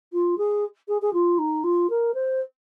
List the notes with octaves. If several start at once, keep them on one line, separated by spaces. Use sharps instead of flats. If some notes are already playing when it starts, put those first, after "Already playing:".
F4
G#4
G#4
G#4
F4
D#4
F4
A#4
C5